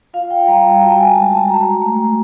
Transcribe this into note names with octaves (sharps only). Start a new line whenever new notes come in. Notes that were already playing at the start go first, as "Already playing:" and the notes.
F4 F5
G5
G3 A#5
A5
F#4 G5
G#5
G#3 A5
A5
F#4 A#5
A3